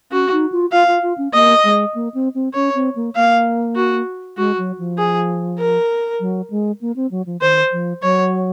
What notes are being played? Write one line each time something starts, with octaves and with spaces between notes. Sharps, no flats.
C#4 F#4
D#4
F4
F4 F5
F4
F4
C#4
A#3 D#5
G#3
A#3
C4
C4
C#4 C#5
C4
A#3
A#3 F5
F#4
G#3 F#4
F#3
F3
G#4
A#4
F#3
G#3
A#3
C4
F#3
F3
D#3 C5
F3
F#3 C#5